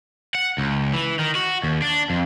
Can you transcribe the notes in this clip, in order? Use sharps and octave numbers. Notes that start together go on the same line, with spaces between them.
F#5
C#2
E3
D#3
F#4
D#2
D4
F2